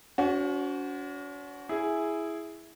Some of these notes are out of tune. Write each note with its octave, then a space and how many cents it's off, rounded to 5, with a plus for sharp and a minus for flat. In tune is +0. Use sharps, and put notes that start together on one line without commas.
C#4 +45 F#4 +0 C5 +0
E4 +0 G#4 +0